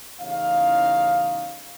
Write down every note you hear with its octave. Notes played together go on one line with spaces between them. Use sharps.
A1 E2 C#3 D#4 C#5 F5